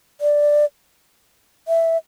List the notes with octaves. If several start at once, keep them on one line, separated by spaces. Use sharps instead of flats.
D5
E5